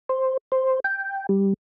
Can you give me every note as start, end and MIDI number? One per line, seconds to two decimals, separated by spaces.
0.09 0.37 72
0.52 0.80 72
0.84 1.26 79
1.29 1.53 55